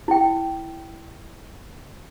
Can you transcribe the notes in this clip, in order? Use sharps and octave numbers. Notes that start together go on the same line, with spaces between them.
E4 G5